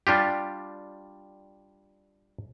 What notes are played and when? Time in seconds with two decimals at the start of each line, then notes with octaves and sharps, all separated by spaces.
0.07 G3 D4 F4 G4